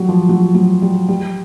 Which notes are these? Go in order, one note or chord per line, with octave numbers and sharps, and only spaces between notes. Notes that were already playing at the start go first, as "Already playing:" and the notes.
Already playing: F#3 G3
F3
F#3
F#3
G3
G3